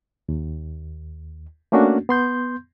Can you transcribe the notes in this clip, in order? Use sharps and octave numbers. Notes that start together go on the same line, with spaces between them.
D#2
A3 A#3 C#4 D4 F#4
B3 C6 G6